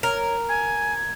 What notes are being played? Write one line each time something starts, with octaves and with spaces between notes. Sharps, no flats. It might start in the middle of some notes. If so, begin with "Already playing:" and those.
A#4 C#5
G#5 G#6